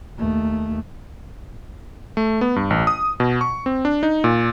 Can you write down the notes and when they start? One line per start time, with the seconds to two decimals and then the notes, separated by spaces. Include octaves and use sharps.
0.18 D#2 A3
2.17 A3
2.41 B3
2.56 G2
2.70 A1
2.87 D#6
3.20 B2
3.41 C#6
3.66 C4
3.85 D4
4.03 D#4
4.24 A#2